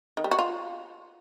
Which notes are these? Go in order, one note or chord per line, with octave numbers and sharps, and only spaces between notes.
D#3
G3
F#4
F4